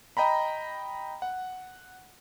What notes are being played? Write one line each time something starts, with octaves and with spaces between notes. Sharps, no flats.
D#5 G5 A#5 B5
F#5